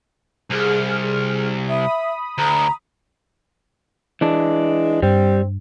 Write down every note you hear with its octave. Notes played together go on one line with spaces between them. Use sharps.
C2 G#4 F6
E5 B5 D#6
D2 A#5
E3 G#3 D4
G2 G3 C4